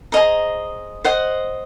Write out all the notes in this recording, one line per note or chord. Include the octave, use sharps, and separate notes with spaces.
G#4 C5 D#5 A#5
C5 D#5 F#5